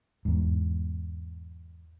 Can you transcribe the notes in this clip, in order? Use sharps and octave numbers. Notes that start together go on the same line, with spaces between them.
E2 G#2